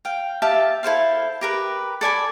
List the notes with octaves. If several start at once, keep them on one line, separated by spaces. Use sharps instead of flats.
F5 G5
G4 E5 F5 A5
E4 A4 C5 F5
G4 A#4 B4
A4 D5 G#5 B5